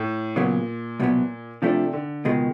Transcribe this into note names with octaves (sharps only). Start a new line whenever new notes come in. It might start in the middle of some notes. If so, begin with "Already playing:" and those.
Already playing: A2
A#2 C#3 F#3 B3
C2 B2 F#3 B3
C3 F3 A3 D4
D3
C#2 B2 D#3 G#3